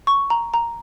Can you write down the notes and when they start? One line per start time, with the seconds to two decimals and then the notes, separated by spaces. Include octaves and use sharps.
0.07 C#6
0.30 A#5
0.54 A#5